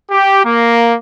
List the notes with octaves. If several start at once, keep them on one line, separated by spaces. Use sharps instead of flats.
G4
A#3